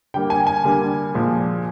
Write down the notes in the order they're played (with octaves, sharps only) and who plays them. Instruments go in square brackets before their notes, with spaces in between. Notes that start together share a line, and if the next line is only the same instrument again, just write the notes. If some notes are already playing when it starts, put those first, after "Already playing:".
[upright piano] D3 G3 A#3 G5
G#5
G#5
D3 G3 A#3
A#2 F3 G#3